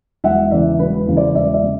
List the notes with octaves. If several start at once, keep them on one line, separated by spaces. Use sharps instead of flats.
E1 E5 F#5
E2 C#3 D5 E5
E1 B4
E2 C#3
C5 D5
E1 D5 E5
D5 E5
C#3